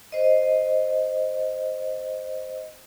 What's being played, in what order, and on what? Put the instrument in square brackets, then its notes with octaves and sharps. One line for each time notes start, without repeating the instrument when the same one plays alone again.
[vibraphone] C5 D#5